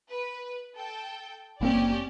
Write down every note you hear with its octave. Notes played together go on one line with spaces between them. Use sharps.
B4
A4 G5
F#1 A#3 C4 C#4 G4 D5